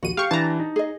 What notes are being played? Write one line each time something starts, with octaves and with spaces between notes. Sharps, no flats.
A#1 D#2 F#4 D#7
G4 F5 C#6
E3 D4 A5 A#5
D#4
G#4 D#5